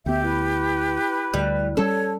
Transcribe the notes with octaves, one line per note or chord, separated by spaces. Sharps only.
D2 B3 G4 E5 G5
E4 B4
D2 G3
G3 C#4 A4 C#5